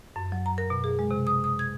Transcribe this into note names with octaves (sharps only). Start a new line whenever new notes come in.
F#2
F#3
A#5
A#4
B2
G#4
G#3
C3
D#6
D#6
G#6